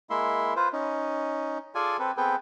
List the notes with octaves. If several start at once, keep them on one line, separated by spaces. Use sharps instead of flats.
G#3 A#3 E4 E5 C6
F4 B4 C5
C#4 D#4
F4 G#4 A4 D5 G#5
C4 A4 B4
B3 C4 G#4 A4 B4 G5